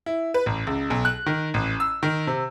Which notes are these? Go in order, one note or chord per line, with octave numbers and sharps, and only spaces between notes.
E4
B4
A1
C#2
B1
F#6
D#3
A1
E6
D#3
C3